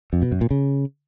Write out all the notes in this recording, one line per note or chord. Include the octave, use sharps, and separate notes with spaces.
F2
B2
F#2
A#2
C#3